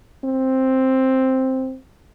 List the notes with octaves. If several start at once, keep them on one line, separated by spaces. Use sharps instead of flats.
C4